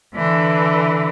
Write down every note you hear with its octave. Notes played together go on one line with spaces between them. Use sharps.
D3 E3